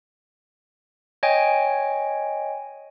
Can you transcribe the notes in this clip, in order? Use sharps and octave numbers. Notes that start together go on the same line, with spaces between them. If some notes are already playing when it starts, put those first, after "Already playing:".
C#5 D#5 G5 G#5